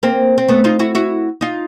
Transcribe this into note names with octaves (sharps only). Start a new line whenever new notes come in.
A#3 C4
C4
A3 B3
D#4 F4
E4 F#4
E4 F#4
D#4 F4